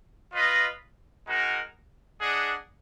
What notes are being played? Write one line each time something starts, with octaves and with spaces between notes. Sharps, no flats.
F4 B4 D#5
G#3 D#4 F#4 A#4
D4 G#4 D#5 F#5